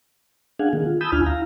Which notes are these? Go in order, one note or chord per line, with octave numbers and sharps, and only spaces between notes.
D4 G#4 F5 F#5 G#5
D#3 A#3 G#4
F4
G#5 A5 B5 D#6 E6 G6
D2 D4 E4 F4 G#5 F6
E4 F5 A#5